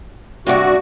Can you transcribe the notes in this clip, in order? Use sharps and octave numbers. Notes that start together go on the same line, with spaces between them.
G2 C3 F#4 D5